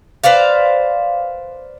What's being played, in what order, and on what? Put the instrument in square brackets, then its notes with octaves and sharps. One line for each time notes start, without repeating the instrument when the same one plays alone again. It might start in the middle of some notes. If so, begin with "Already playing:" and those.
[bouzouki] B4 C5 D5 F5